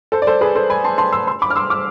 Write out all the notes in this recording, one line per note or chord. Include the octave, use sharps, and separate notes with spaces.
A4 C5
D5
A4 C5
G#4 B4
A4 C5
G#5 B5
A5 C6
A5 C6
C6 E6
C6 E6
B5 D6
F6
C6 E6
D6 F6